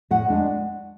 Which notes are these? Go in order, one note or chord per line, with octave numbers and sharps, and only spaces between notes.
A2 F#5
G#3 D4